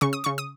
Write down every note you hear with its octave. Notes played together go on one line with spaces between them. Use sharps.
C#3 C#6
D#6
C#3 C#6
D#6